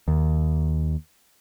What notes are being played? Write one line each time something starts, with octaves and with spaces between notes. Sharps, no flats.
D#2